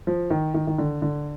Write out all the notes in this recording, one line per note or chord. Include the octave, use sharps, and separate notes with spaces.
F3
D#3
D#3
D#3
D3
D3